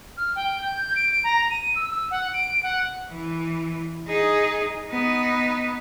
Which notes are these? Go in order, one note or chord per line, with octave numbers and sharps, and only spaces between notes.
F6
G5
G6
D7
A#5
D#7
E6
E6
F#5
D7
F#5
E3
D#4 G#4
B3 D#4